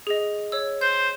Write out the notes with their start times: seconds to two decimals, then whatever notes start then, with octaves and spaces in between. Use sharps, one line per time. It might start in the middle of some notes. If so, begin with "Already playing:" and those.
0.07 G#4 D#5
0.52 C#5 E6
0.81 C5 G6